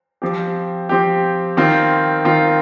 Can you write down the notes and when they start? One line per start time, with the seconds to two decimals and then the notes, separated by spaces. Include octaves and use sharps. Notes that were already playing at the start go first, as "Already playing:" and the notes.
0.22 F3 C4 G4
0.89 F3 C4 G4
1.57 D#3 C4 F4
2.25 D#3 C4 F4